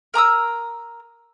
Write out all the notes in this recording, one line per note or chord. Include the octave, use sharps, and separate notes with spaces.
A#4 A#5 D#6 E6